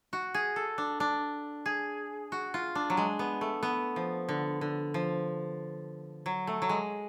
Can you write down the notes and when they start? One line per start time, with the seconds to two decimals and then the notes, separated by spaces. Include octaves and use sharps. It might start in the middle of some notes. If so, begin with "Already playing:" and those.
0.13 F#4
0.34 G#4
0.56 A4
0.78 D4
1.00 D4
1.66 G#4
2.32 F#4
2.54 F4
2.75 D4
2.90 F#3
2.97 G#3
3.19 B3
3.41 A3
3.63 B3
3.96 F3
4.29 D3
4.61 D3
4.94 F3
6.26 F#3
6.47 A3
6.62 F#3
6.69 G#3